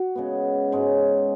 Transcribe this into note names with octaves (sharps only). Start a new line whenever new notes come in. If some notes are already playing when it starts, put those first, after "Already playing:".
Already playing: F#4
C#3 G#3 B3
G#2 G#3 C#4